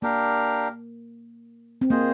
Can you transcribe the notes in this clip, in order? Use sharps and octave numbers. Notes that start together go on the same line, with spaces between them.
A#3 D4 G4 A#4 F5
C4
A#3 F4 G#4 C5 D#5